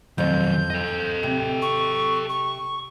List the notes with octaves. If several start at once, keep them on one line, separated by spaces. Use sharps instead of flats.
F2 D#3 F#3 G6
A4 D#5
C3
C#6
C#6